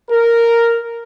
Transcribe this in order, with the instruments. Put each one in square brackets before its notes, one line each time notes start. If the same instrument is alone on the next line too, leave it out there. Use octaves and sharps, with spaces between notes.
[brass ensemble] A#4